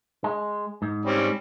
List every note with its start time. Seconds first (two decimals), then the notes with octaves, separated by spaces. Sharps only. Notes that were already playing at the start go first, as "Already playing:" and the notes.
0.24 G#3
0.82 G#2
1.05 G3 C4 C#4